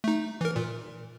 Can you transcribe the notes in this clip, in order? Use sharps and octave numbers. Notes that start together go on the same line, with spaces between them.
A3 D#4
E3 A#4
A#2